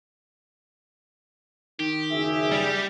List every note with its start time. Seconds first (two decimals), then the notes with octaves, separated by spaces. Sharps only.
1.80 D#3 G4
2.11 F#1 G#4 E5
2.51 G3